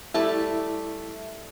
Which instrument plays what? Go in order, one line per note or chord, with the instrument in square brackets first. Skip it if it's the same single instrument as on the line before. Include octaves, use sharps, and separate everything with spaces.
[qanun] G3 A3 A5 [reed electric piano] E4 [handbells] E5